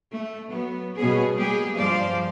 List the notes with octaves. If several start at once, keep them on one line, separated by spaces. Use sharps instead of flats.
A3
F#3 B3
B2 G3 B3 C#4 G#4
G3 G#3 A#3 G4 G#4
G2 F3 G3 C5 D5 F5